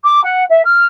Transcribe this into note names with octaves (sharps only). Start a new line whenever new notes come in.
D6
F#5
E5
F6